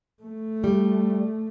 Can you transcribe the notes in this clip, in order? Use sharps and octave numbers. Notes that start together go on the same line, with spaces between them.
A3
G3